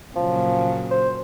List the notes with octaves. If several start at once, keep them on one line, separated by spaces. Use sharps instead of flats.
A#2 C#3 F3 F#3
C5